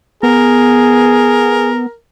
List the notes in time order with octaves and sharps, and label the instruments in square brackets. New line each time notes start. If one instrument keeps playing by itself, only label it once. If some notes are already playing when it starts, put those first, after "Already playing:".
[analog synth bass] B3 [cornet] G#4 [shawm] A#4